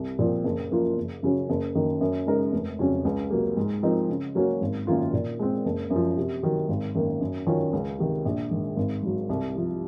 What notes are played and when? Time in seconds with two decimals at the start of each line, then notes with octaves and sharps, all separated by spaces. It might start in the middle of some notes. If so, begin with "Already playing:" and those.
Already playing: C2
0.19 A#2 F3 C4
0.44 F#1
0.71 F#2 F3 A#3 F4
0.97 F#1
1.23 F#2 C#3 F#3 C#4
1.49 F#1
1.75 F#2 D#3 A#3 D#4
2.01 F#2
2.27 C#3 G#3 D#4 A#4
2.52 F1
2.79 F2 C#3 F#3 C#4
3.05 C#2
3.31 C3 F#3 A#3
3.57 G#2
3.83 F3 C4 D#4 A#4
4.09 C#3
4.35 F#3 A#3 C#4 F#4
4.61 G#1
4.87 F#2 D#3 A#3 F4
5.13 A#2
5.39 G#3 C4
5.65 F#1
5.90 F#2
5.96 F3
6.17 C3
6.43 D#3 F#3
6.69 G#1
6.95 F#2 D#3 A#3
7.21 F#2
7.47 D#3 F#3 C#4 F4
7.73 C#2
7.99 C3 D#3
8.25 A#1
8.51 G#2 D#3
8.77 G#1
9.03 G#2 F#3
9.29 C2
9.55 C3 F3